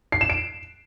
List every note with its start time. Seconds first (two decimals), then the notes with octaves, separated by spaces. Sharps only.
0.12 C7
0.21 E7
0.30 D7